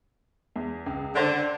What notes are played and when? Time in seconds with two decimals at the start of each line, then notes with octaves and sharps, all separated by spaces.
0.56 E2
0.86 C#2
1.15 D3 D4 C5 F#5